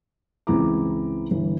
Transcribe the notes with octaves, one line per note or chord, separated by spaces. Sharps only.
C#2 E3 C4 E4 A#5 D6
G1 E3